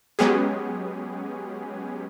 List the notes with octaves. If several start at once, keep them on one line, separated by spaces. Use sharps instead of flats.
F#3 G#3 B3 C#4 G4 G#4